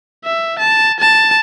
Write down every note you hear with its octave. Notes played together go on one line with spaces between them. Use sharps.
E5
A5
A5